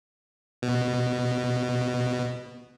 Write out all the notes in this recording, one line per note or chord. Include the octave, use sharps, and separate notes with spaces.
B2